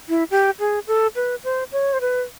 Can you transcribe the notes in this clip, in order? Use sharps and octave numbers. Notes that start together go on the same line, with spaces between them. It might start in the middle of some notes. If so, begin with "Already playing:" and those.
E4
G4
G#4
A4
B4
C5
C#5
C5
B4